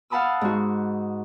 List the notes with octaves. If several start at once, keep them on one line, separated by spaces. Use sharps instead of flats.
F5 F#5 A5 B5 D#6 E6
G#2 F#4